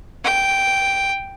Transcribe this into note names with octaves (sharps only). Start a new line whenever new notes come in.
G5